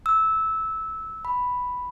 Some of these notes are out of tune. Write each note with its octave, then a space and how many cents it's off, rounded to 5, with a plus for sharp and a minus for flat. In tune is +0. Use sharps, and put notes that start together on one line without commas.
E6 -15
B5 +0